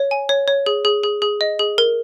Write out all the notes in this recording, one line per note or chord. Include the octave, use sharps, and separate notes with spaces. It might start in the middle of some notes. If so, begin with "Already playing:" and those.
Already playing: C#5
G#5
C#5
C#5
G#4
G#4
G#4
G#4
D#5
G#4
A#4